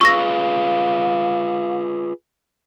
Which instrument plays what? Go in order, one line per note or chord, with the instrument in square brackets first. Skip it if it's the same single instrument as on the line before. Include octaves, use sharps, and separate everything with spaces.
[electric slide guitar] F4 G#4 B4 [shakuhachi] F5 [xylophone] C#6 E6 A#6